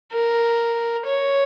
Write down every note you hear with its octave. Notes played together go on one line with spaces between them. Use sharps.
A#4
C#5